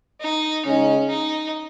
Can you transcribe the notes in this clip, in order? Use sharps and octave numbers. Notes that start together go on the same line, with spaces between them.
D#4
C#3 G#3 C#4 D#4
D#4